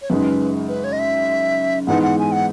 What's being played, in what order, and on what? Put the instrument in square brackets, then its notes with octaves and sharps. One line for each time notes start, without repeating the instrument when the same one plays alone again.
[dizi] C#5
[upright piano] F#2 C#3 G#3 D#4 [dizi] B4
[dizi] B4
C#5
D#5
E5
[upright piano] G#2 E3 G#3 B3 D#4 [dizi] F#5
[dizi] F#5
G#5
F#5